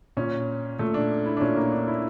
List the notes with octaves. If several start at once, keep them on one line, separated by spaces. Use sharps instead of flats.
A#2 C#4
A#2 A3
D4
E4
D4
A#2 C#4
A#3
D4
E4